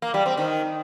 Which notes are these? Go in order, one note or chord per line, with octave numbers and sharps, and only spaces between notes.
A#3
G3
C4
D#3